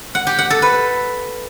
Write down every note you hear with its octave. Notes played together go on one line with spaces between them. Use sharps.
F#5
G4
F#5
A4
B4